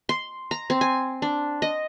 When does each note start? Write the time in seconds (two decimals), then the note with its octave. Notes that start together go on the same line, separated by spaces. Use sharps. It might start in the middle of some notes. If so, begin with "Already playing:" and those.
0.09 C6
0.51 A#5
0.70 C4
0.81 G#5
1.22 D4
1.62 D#5